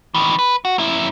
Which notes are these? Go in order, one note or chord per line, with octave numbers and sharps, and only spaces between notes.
D#3 E3
B4
F#4
F#2 E4